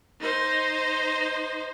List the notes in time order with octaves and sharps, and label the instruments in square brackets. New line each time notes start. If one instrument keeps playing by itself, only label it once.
[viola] D#4 C5